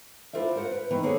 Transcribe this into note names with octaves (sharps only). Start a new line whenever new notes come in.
D4 E4 F4 A#4 C5 E5
A#4 C5 F#5
B4
D#3 E3 B3
D3 A#3 G#4 A4 C5 C#5